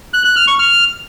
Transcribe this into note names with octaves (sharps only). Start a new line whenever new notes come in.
F#6
F#6
F6
C#6
F6